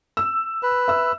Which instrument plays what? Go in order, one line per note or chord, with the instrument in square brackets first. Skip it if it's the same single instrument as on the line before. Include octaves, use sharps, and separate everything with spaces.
[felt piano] E6
[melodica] B4
[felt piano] E5 E6